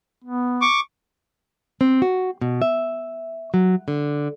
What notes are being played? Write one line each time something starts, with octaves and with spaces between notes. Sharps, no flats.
B3
C#6 D6
C4
F#4
B2
E5
F#3
D3